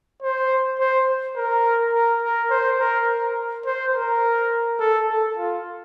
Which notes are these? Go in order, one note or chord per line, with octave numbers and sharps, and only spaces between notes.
C5
C5
A#4
A#4
A#4
C5
A#4
A#4
C5
A#4
A4
A4
F4